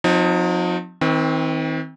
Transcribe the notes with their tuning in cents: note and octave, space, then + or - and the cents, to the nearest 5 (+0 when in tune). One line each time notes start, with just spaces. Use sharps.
F3 +40 C4 -25 D#4 +0
D#3 +40 C4 +0